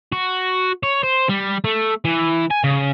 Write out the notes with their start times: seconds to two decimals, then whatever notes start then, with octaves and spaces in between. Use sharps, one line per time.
0.12 F#4
0.83 C#5
1.03 C5
1.29 G3
1.65 A3
2.05 E3
2.51 G#5
2.64 C#3